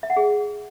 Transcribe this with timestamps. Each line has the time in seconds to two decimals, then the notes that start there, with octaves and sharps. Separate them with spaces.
0.03 E5
0.10 F#5
0.17 G#4